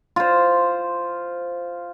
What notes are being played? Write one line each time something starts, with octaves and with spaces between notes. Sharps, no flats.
F4 C5